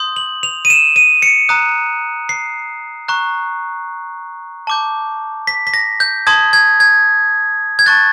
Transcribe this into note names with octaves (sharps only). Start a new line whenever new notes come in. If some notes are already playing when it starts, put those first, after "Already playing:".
Already playing: C6 D#6 G6
F#7
F7
D#7
E7
D#7
C#7
A#5 D#6 F#6
C7
A#5 C#6 F#6
A5 D6 G6
B6
B6
A#6
G6
A5 C6 D#6 G#6
G#6
G#6
G#6
A5 C#6 F#6 A6